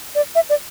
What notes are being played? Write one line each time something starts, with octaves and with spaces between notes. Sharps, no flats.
D5
E5
D5